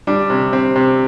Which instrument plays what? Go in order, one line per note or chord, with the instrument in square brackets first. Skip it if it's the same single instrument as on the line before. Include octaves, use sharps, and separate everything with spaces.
[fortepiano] G3 D4
C3
C4
C3